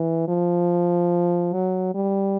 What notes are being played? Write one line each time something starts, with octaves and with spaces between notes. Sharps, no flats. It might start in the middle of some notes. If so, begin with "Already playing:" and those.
Already playing: E3
F3
F#3
G3